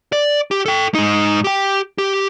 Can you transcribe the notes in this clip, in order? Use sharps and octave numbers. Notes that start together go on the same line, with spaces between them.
D5
G4
A4 G5
G#2 D#4
G4 G5
G4